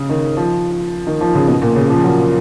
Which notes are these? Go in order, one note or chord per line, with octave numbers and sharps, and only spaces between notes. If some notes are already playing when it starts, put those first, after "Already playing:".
Already playing: C#3
D#3
F3
D#3
F3
C#3
B2
A#2
C#3
F3
F#3